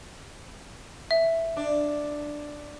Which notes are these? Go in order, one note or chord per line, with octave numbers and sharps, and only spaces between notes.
E5
D4